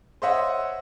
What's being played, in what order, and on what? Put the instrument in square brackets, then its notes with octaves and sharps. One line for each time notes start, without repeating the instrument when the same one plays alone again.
[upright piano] C5 C#5 D#5 E5 F#5